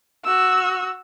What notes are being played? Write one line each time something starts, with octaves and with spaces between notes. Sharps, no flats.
F#4 E6